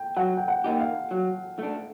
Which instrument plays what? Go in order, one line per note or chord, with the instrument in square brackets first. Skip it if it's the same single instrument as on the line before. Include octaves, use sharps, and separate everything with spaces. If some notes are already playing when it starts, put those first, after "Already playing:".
Already playing: [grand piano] G5
[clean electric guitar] F#3 [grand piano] F#5
[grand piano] G5
F#5
[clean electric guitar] A#3 D#4 G4
[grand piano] F5
[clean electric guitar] F#3
A3 D4